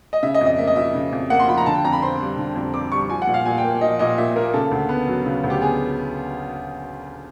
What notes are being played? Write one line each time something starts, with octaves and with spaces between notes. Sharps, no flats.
D#5
C#3 E5
D#5
F2
D#5
A#3 E5
D#5
F3 E5
C#3
F2
A#3 F#5
C6
F3 B5
A#5
D3 A5
G5
F2 A#5
B5
C4 C6
G3
D3
F2
C4 D6
G3 C#6
F3 G#5
F#5
A#2
F5
A#2 G#5
G5
A#3
F3 D#5
A#2 D#5
A#2 E5
A#3 A#4
C#3 A4
D2
B3
F#3
C#3
D2
G4
B3 G#4